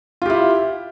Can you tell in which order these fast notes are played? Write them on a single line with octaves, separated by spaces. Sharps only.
F4 G4 E4